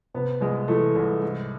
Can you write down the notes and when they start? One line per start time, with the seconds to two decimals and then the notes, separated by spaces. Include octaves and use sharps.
0.14 C3 B3
0.41 C2 G#3
0.68 E3 A3
0.95 C2
1.22 G#2